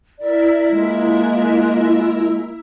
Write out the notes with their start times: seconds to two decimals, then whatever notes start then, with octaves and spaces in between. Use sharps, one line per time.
0.18 E4 A#4 D5 E5
0.71 G#3 A#3 F4